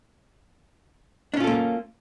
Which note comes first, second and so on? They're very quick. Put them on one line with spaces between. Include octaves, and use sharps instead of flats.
D4 C#4 F4 A4 A#3